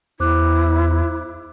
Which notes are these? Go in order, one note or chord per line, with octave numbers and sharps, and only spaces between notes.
E2 E4 C5 D6 F#6